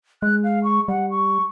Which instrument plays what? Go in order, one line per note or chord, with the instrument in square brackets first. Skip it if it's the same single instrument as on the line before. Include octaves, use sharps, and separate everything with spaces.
[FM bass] G#3 [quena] F#6
[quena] F5
C#6
[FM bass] G3 [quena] F#5
[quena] C#6